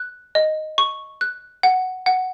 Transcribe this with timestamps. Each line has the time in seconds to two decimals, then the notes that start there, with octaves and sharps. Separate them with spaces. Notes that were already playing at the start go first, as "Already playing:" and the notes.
Already playing: F#6
0.35 D#5
0.78 C#6
1.21 F#6
1.63 F#5
2.06 F#5